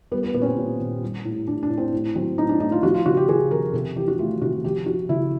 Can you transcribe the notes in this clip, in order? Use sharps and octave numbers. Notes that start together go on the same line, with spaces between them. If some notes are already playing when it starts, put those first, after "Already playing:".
G3 B3
B3
A#2 B3
C#4
C4
A#2
A#2
G3
A2
A2 D4
D4
A2
C4
A2
F#3 C4
A2 D#4
D4
A2 D#4
F4
F3 F#4
F4
C#3 F#4
G4
C#3 G#4
F3 A#4
C3 A4
E3 G4
F#4
A3 F4
C3 F#4
F3 G4
F3 F#4
C#3 E4